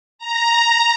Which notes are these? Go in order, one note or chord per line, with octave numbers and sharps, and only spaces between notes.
A#5